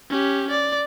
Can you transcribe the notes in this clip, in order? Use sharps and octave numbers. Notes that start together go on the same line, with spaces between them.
C#4 G4
D5